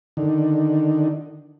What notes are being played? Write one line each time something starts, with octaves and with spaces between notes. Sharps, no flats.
D3 D#3